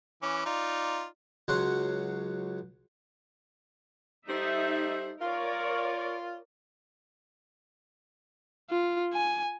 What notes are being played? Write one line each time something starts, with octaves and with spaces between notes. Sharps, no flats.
E3 C#4 D6
D#4 F4 D5
C#2 F#3 F#5 C6
G3 D#4 A4 C5 E5
F4 A#4 C#5 D5
F4
G#5